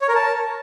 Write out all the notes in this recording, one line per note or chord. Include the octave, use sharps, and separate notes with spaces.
C#5
A#4
A5